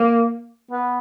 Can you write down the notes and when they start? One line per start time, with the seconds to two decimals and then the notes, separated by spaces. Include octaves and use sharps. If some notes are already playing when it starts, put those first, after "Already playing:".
Already playing: A#3
0.71 B3